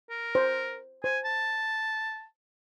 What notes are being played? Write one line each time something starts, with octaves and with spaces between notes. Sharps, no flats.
A#4
C5
C5 G#5
A5